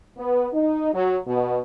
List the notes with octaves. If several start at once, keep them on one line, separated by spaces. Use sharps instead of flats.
B3
D#4
F#3
B2